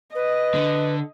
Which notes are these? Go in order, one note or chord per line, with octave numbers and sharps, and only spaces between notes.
B4 D#5
D3